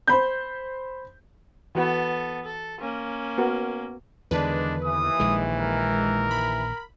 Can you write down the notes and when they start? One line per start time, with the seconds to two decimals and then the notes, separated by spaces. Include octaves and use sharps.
0.07 C5 B5 G6
1.75 E3 B3 F#4 A4 B4
2.44 A4
2.80 A#3 C#4
3.38 B3 F#4 A#4
4.31 E2 D3 D#3 G#3 D4 B4
4.84 D#2 E3 D#6
5.20 A#1 D#3 G#3
5.61 A#4
6.31 B5